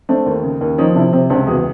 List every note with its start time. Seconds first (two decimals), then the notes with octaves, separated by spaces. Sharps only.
0.09 A3 C4 D4
0.26 D#2
0.44 C#3
0.61 D#2
0.78 F3 C#4 D#4
0.95 C3 D4 E4
1.13 C3 C4
1.30 C#2 C4 D4
1.47 E2 F#4 G#4